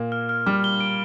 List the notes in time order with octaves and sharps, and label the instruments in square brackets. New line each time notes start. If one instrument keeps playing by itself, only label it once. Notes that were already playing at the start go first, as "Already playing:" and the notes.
Already playing: [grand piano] A#2 A#3
[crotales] F6
F6
[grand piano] G3 [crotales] F6
[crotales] G7
D7